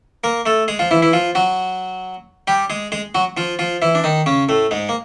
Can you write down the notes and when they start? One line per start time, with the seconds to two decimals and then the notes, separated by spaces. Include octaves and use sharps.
0.24 A#3 A#4
0.46 A3 A4
0.68 G#3 G#4
0.79 F3 F4
0.91 E3 E4
1.02 E3 E4
1.13 F3 F4
1.35 F#3 F#4
2.47 G3 G4
2.70 G#3 G#4
2.92 G#3 G#4
3.15 F#3 F#4
3.37 F3 F4
3.59 F3 F4
3.82 E3 E4
3.95 D4
4.04 D#3 D#4
4.26 C#3 C#4
4.49 A2 A3
4.71 G#2 G#3
4.89 A#3